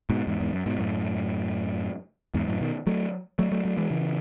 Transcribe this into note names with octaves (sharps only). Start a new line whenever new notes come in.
G#2 B2
E2 G#2
E2 G#2
F#2
G#2 B2
F#2 A2
E2 G#2
F#2 A2
B2 D#3
F#3 A3
F#3 A3
F#3 A3
F#3 A3
E3 G#3
C#3 E3